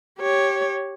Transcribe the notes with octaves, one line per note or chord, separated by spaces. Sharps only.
G4 C#5